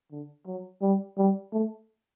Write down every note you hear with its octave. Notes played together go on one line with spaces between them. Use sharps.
D3
F#3
G3
G3
A3